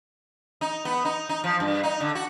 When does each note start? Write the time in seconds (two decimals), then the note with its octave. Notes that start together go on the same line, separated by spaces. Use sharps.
0.61 D#4
0.85 B3
1.05 D#4
1.29 D#4
1.44 F3
1.60 G2
1.83 D#4
2.00 D3
2.15 F#4